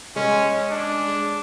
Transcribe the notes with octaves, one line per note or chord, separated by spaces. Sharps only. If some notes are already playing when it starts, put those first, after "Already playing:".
G#3 C#4
D4